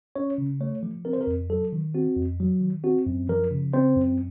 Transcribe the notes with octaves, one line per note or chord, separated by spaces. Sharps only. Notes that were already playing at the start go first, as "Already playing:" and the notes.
C#4 C#5
C#3
A3 C#5
F3
C4 A#4
C5
A#4
F2
F#3 A4
D#3
C4 F#4
F2
F#3
D#3
C4 F#4
F#2
F3 A#4
C#3
C4 C5
F#2